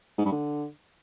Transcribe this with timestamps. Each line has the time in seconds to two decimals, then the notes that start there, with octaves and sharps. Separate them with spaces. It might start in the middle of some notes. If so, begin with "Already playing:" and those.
0.18 G#2
0.25 G2
0.32 D3